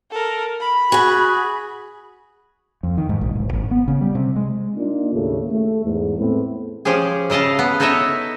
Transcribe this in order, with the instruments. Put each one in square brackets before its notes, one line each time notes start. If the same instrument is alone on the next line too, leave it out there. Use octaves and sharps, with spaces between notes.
[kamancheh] A4 A#4
B5
[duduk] F#4 [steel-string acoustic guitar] G#4 G#5
[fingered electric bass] F2
D#3
G#2
A#1
D1
G#1
B3
C#3
G3
C3
G#3
[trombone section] A#3 D4 D#4 F4
D#2 A2 C#3 A3
A3
E2 G#2
A2 B3 C4 B4
[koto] F3 C#4 G4 G#4
C#3 E4 D#5 F5 A5
B3
D#4 E4 A4 C#5 D#5 E5